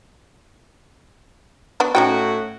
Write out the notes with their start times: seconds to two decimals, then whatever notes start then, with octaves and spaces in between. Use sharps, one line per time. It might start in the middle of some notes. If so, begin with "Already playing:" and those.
1.80 B3 D4 F#4
1.95 A2 C#4 D#4 F#4 G5